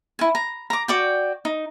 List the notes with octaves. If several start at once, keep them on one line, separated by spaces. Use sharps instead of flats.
E4 G#5
A#5
A#5 D6
F#4 D5 G5
D#4